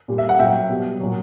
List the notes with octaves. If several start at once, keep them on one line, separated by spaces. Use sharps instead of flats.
A#2 G3
E5
F#5
A#2 F#3 E5 G5
B2 G3
A#2 F#3